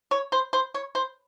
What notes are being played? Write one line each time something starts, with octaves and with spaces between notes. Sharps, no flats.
C#5
C5
C5
C#5
C5